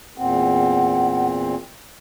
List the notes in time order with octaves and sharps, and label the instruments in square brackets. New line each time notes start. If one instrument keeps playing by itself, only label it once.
[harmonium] E2 A#2 C4 [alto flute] F#5